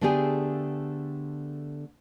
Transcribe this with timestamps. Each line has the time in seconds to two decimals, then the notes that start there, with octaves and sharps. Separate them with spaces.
0.01 D3 A3 B3 D4 G4 G#4